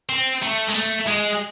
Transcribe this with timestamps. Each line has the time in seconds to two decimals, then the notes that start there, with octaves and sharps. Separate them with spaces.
0.09 C4
0.42 A3
0.69 G#3
0.74 A3
1.07 G#3